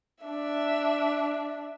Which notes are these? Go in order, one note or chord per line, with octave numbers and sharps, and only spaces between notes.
D4 E5